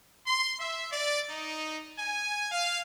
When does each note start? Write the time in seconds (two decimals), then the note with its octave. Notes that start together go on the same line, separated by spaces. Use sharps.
0.25 C6
0.58 E5
0.91 D5
1.30 D#4
1.99 G#5
2.51 F5